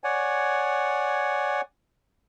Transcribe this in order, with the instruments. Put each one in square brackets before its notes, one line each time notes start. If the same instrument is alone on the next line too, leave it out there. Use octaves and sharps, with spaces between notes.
[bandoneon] C#5 D5 F#5 G#5